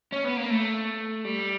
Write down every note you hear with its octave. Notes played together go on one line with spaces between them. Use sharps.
C#4
B3
A#3
A3
G3